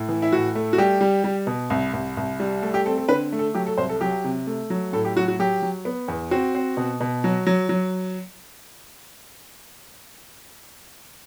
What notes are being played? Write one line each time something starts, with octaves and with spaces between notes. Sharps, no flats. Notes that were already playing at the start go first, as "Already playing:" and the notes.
Already playing: A2
E3
E4
A2 F#4
A3
F#4
G3 G4
G3
G3
B2
C2
C2
C2
G3
A3 A4
G4
C4 A4
A4
D3 B4
A3
A4
F#3 G4
A4
C2 C5
A4
F#3 G4
C3
A3
F#3
A2 A4
G4
F#3 F#4
F#4
F#3 G4
F#3
B3
E2
C4 F#4
C4
B2
B2
F#3
F#3
F#3